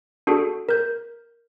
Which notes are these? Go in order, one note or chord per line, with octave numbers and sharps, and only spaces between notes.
D4 F#4 G#4 A4
A#4 G6